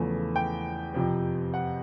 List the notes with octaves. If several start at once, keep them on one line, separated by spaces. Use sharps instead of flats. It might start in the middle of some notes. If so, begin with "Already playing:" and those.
Already playing: E2 C#3 F3 A3
G5
F2 C3 F3
F#5